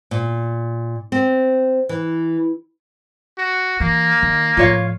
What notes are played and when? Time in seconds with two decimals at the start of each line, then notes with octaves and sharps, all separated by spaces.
0.11 A#2
1.12 C4
1.89 E3
3.38 F#4
3.80 E3 A#3
4.22 D#3
4.57 A2 F3 F4 C#5 F5